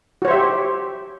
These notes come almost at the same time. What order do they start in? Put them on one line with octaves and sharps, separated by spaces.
F#4 C#5 C5 E5 G4